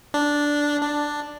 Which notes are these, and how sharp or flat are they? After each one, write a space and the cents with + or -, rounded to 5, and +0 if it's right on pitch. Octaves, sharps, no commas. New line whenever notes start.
D4 -5
D4 +5